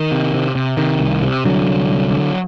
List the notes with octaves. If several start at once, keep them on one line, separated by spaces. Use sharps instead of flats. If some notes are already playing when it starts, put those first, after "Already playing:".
Already playing: D#3
C3
C3
C3
C3 D#3
C2
C3
C2 D3 F#3
C2
C2
D3